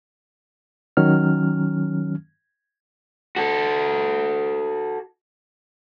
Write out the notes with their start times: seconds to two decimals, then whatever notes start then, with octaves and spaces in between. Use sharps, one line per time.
0.97 D#3 F#3 C#4 F6
3.36 F#4 A4